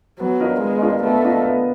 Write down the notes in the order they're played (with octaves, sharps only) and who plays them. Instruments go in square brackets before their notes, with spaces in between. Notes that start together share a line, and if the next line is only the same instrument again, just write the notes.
[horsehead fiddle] F#3 [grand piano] B3
[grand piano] D4 F4 A#4 D#5
[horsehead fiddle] G#3 [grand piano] B3
[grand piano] D4 F4 A#4 D#5
[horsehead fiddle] A3 [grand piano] B3
[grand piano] D4 F4 A#4 D#5
B3